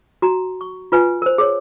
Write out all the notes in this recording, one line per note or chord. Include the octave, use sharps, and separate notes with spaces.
F#4 A#5
C#6
F4 B4 G#5
A#4 C5
G#4 A#4 C#5